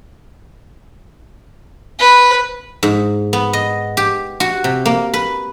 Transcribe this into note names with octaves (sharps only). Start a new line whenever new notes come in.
B4
G#2
B3
D#5
G4
F#4
C3
A#3
B4